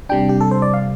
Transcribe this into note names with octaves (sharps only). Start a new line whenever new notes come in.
C3 G3 D4 G5
G4
A4
C5
D5
F5